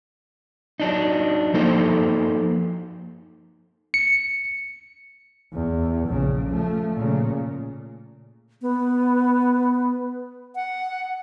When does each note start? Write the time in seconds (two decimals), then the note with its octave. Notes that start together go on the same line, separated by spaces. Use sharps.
0.80 F#3 D4 D#4
1.54 F3 A#3 D#4 A4 C5
3.94 C#7
5.54 E2
6.09 A#1 C#3
6.49 F3 A3
6.95 A#2 C#3
8.62 B3
10.55 F#5